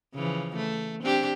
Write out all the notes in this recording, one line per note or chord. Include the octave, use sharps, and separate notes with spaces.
C#3 E3 F3
A3
C4 D4 G4